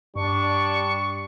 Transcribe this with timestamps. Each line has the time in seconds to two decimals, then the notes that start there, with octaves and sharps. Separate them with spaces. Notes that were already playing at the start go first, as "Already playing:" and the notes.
0.16 G2 G3 D4 C#6